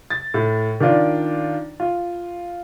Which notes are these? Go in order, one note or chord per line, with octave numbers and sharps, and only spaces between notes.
A6
A2
D#3 D4 F4 D5
F4